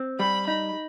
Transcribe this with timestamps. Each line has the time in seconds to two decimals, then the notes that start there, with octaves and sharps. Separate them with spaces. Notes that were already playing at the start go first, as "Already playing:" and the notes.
Already playing: C4
0.19 G3 B5
0.47 D#4 B5